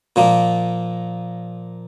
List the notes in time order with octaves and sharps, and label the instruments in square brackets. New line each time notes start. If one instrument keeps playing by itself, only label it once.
[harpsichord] A#2 F3 A#3